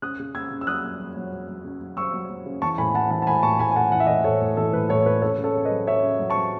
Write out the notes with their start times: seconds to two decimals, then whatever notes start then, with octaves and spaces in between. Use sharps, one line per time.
0.02 C#3 D#6 F#6
0.19 C#3
0.35 C#3 E6 G#6
0.51 C#3
0.61 E6
0.67 F#3 D#6 F#6
0.84 F#3
1.00 F#3
1.17 F#3
1.32 F#3
1.49 F#3
1.64 C#3
1.81 F#3
1.97 F#3 C#6 E6
2.14 F#3
2.29 F#3
2.46 C#3
2.62 E3 A5 C#6
2.78 A2 G#5 B5
2.94 E3 F#5 A5
3.10 E3 F#5 A5
3.22 A5
3.27 A2 G#5 B5
3.43 A2 A5 C#6
3.59 A2 G#5 B5
3.71 G#5
3.76 A2 F#5 A5
3.92 E3 F#5
4.00 E5
4.07 A2 D#5 F#5
4.24 A2 A4 C#5
4.41 A2
4.57 E3 A4
4.73 A2 B4
4.89 A2 A4 C#5
5.06 A2 B4
5.22 C#3 A4 C#5
5.38 C#3
5.44 A4 C#5
5.55 C#3
5.65 B4 D#5
5.71 F#3
5.87 C#3 C#5 E5
6.03 C#3
6.19 F#3
6.30 A5 C#6
6.35 F#3